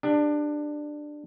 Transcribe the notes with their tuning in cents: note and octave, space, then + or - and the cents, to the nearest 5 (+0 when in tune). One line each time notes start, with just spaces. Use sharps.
D4 +15 G4 +30